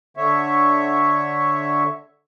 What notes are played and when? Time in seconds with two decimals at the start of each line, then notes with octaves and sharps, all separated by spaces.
0.17 D3 C#5 E5